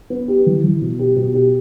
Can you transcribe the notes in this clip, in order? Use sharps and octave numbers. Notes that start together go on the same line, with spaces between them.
B3
G4
E3
E3
B2
G4
B2
G4